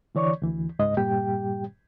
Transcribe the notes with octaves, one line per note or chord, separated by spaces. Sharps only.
D3 E3 C#5 D5 C#6
D2 E3
C#2 G#2 D#5
G2 A#2 G3 G4 G5